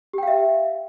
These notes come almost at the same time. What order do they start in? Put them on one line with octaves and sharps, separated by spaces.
G4 G5 F5 E5